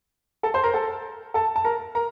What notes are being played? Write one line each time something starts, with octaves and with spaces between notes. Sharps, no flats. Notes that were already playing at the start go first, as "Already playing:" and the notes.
A4 A5
C5 C6
A#4 A#5
A4 A5
A4 A5
A5
A#4 A#5
A#4 A#5